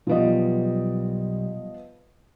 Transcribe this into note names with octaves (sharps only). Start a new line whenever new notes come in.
B1 F3 G3 B3 D#5